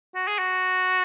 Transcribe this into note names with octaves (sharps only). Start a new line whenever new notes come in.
F#4
G#4
F#4